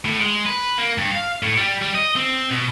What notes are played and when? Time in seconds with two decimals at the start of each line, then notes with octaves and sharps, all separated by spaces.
0.05 A2
0.19 G#3
0.46 B4
0.78 A#3
0.98 G2
1.12 F5
1.43 A2
1.57 G3
1.82 G3
1.95 D#5
2.17 C4
2.50 B2